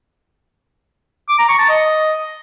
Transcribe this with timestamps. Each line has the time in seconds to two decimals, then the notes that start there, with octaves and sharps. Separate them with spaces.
1.29 D6
1.39 A#5
1.49 C#6
1.59 A5
1.69 D#5